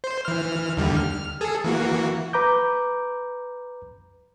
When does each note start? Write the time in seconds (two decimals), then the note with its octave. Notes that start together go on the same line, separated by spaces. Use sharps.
0.04 C5
0.25 E3 F6
0.77 D#2 D3 G3
0.97 F6
1.41 G#4 A4
1.64 E3 A#3 F#4
2.33 B4 A#5 D6 G6